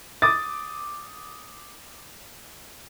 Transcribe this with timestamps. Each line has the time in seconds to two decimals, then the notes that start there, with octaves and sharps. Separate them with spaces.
0.22 D6 D#6 A6